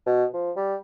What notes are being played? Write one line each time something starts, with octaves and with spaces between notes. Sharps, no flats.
B2
F3
G3